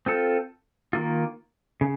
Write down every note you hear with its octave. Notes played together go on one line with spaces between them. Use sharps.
C4 F4 A4
D#3 A#3 F4
C#3